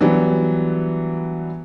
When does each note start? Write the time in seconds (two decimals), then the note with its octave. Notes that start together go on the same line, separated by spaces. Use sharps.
0.01 E3 F#3 G3 B3 D4